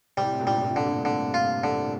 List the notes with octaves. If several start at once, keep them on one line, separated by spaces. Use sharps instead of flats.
A2 C3 G3
G2 A#2
C3 G3
G2 A#2
D3
G2
D3
F4
D3